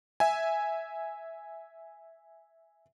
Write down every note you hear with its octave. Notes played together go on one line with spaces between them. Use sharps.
E5 G#5